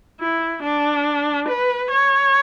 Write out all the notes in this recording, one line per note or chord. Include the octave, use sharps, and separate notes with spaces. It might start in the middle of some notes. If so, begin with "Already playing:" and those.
E4
D4
B4
C#5